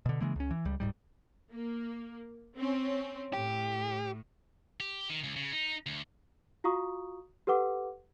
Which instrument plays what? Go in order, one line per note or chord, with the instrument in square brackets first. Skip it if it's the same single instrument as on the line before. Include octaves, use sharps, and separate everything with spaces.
[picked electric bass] B2 D3
C#3 E3 G#3 A#3
C#2 C#4
E3
C#2 G3
D1 C2 G#2 G3
[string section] A#3
C4 C#4
[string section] A2 [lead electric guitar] G4
[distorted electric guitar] G4
D#3
C#2
C#3
D#4
D2
[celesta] F4 F#4 F5 A#5 C#6 D#6
G4 A4 B4 F#5 D6